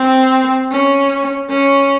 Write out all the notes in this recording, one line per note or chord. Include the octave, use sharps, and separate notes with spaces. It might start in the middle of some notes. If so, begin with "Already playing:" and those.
Already playing: C4
C#4
C#4